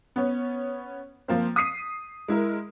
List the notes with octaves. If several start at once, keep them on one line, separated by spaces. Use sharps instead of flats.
B3 C#4
F3 A#3 C4
D#6 B6 C7 D#7
G#3 E4 A#4